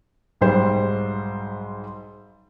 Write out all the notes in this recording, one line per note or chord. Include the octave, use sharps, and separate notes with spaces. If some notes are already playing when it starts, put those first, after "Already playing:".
B1 G#2 G3 C5 G5